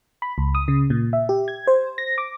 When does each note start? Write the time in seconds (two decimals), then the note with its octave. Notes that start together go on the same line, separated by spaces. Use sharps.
0.22 B5
0.38 C#2
0.55 D#6
0.68 C#3
0.90 A#2
1.13 E5
1.29 G4
1.48 G#6
1.67 C5
1.98 A#6
2.18 D6